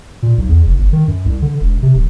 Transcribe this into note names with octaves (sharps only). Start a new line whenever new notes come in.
A#2
B1
E2
F1
G1
D#3
F#2
C2
D3
E1
C3
D1